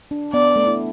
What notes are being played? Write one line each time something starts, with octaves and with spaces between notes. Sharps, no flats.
D4
B3 D5
A3
E4